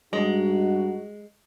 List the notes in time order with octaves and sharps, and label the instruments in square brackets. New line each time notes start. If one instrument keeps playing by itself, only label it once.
[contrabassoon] G2 [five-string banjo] G#3 [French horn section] D#4 F#4